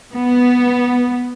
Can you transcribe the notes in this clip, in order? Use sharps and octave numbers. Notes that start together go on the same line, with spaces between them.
B3